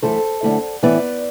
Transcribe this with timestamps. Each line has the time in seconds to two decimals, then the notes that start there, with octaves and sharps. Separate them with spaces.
0.02 F#2 E3 A3 E4 A4 C5
0.43 F#2 D3 A3 E4
0.83 A2 E3 B3 E4 B4 D5